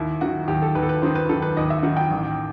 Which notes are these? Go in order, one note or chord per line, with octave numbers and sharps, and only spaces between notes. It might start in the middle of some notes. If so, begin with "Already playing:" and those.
Already playing: D#2 E4
D#3 F#4
D#2 G4
A4
D#2 B4
A4
B4
D#3 C5
B4
D#3 A4
B4
D#2 D#5
E5
D#3 F#5
G5
A1